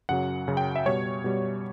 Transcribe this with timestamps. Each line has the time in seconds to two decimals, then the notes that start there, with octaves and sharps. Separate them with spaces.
0.09 F#2 C#3 F#3 F#5
0.47 F#2 C#3 F#3
0.57 G5
0.76 E5
0.86 B2 G3 C#5
1.24 B2 G3